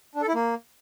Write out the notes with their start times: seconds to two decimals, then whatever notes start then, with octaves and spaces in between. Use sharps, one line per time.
0.15 D4
0.22 A4
0.28 E4
0.35 A#3